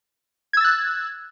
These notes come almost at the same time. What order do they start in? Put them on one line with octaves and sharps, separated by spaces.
G#6 E6 A6 F#6